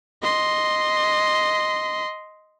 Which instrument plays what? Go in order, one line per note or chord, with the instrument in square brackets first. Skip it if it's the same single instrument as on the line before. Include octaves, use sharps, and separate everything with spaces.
[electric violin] D#5 C6